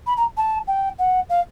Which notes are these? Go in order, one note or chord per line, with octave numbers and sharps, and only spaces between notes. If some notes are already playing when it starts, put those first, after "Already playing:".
B5
A#5
A5
G5
F#5
F5